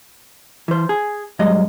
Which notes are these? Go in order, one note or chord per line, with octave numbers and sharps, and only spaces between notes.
E3 C5
G#4
G2 F#3 G#3 D#5